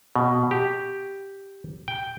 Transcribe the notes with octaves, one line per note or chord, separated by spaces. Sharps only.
B2
G4
G5